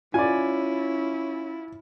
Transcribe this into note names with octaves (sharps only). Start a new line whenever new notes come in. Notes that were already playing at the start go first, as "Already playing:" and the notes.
C#4 E4 F4 D5 G#5